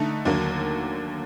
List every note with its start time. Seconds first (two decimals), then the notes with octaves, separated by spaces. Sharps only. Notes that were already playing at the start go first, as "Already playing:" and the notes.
Already playing: D3 A3 D#4
0.25 D#2 D3 F#3 A#3